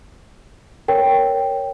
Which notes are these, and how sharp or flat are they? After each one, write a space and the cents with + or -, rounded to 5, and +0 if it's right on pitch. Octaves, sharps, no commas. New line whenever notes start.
A#4 +0 C#5 +0 G5 +0